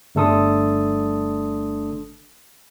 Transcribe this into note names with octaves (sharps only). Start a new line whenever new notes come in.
G1 A3 D4 A4 C6 D#6